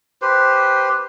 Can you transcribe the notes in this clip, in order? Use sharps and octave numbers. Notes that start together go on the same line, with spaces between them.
G4 B4 C5